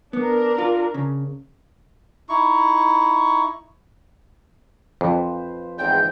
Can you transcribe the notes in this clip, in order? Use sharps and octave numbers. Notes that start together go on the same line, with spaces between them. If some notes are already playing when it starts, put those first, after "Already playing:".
B3 D4 A#4
F4
C#3
D#4 E4 C#6
F2 F3 B4 C5
E2 G#2 C4 G6